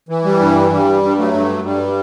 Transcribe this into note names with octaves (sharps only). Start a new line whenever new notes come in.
E3
G3
G2
G2 G3
G2
F#3 A3
G2
G2 G3